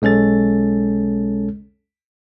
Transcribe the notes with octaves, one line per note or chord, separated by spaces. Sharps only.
B1 G#3 C#4 A4 A6